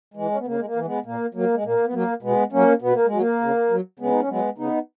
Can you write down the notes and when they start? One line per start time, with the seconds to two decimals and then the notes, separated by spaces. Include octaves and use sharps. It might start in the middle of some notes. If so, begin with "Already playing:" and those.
0.14 E3 G#3
0.31 C#4
0.39 B3
0.46 C#3 A#3
0.58 G#3
0.66 A#3
0.76 E3
0.85 G#3 B3
1.05 A#2 A#3
1.34 F#3 A#3
1.54 G#3
1.64 A#2 A#3
1.86 B3
1.93 F#3 A#3
2.23 B2 G#3 B3
2.52 F#3 A#3 C#4
2.82 B2 B3
2.94 A#3
3.06 G#3
3.12 F#3
3.19 A#3
3.41 C#3
3.70 F#3
3.99 C#3 G#3 B3
4.11 D#4
4.20 C#4
4.29 F#3 G#3 B3
4.58 C#3 B3 D#4